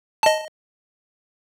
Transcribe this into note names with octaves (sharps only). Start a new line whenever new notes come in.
D#5 A5